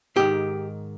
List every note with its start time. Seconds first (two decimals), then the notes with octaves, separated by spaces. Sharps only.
0.16 G#2 D#3 G4